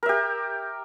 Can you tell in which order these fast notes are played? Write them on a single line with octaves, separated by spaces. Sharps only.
A#4 E5 G4